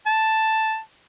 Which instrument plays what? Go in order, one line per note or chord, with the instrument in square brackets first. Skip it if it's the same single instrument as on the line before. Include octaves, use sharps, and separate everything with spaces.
[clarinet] A5